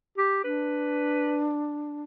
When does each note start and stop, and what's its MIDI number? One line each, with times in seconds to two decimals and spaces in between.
0.18 0.44 67
0.44 2.03 62
0.44 1.50 71